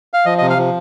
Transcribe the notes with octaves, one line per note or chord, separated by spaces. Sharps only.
F5
F3 D#5
D#5
C3
F5
F3